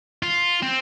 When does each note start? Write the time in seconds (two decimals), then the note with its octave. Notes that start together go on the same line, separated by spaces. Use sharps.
0.23 F4
0.63 C4